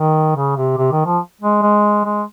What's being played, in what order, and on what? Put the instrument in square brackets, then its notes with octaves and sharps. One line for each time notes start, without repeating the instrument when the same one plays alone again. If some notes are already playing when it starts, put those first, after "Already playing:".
Already playing: [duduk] D#3
C#3
C3
C3
D#3
F3
G#3
G#3
G#3